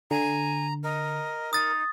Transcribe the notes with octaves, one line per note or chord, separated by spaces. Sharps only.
D3 G#5 A#5
A#4 D#5
D#4 D#6 A6